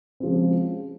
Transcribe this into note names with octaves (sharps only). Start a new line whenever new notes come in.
C#3 F3 G#3 C4